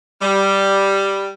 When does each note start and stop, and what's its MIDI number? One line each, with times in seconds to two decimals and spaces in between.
0.21 1.31 55